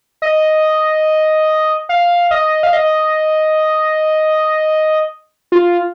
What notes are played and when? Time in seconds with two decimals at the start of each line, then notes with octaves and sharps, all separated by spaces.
0.22 D#5
1.89 F5
2.31 D#5
2.63 F5
2.73 D#5
5.52 F4